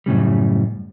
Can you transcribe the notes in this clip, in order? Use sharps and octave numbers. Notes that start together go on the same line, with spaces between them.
F#2 A2 C#3 G3